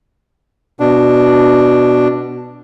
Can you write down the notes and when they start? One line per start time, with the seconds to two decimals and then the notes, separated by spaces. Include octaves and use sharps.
0.80 B2 D4